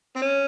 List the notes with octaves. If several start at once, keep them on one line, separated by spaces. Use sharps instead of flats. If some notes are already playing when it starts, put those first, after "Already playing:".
C4
C#4